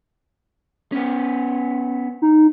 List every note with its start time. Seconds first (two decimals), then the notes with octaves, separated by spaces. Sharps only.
0.92 B3 C#4
2.22 D#4